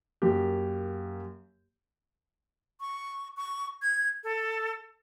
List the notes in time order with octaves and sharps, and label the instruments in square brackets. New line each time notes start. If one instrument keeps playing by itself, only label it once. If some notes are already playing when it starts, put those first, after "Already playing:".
[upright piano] F#2 A#3 G4
[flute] C#6
C#6
G#6
A4